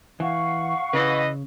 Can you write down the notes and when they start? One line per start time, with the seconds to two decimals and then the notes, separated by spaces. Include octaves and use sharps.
0.20 E3 F5 F#5 C#6
0.94 C#3 E3 B4 D#5